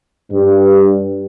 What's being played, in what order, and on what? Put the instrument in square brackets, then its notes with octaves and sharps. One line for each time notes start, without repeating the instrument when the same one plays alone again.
[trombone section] G2